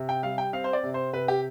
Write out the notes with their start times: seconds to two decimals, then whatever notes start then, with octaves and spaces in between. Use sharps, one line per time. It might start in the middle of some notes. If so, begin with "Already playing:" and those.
Already playing: C3
0.09 G5
0.23 G3 F5
0.38 G5
0.53 C4 F5
0.64 C5
0.73 D5
0.83 C3
0.94 C5
1.13 C3 B4
1.28 G4